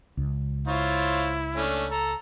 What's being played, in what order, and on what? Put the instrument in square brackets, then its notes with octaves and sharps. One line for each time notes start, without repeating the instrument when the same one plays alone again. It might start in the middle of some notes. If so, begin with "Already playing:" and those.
[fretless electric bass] C#2
[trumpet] E4 [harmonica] F4 C5 C#5
[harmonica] A3 C#4 D4
[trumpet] A4 [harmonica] A#5